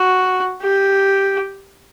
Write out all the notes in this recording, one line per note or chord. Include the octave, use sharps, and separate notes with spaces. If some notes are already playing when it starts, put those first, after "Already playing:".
Already playing: F#4
G4